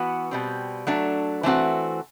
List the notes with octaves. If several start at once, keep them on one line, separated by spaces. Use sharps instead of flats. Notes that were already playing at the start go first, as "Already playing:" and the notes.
Already playing: E3 B3 F#4 B4
B2 G3 C4
F#3 A3 D4
E3 A3 C4 F#4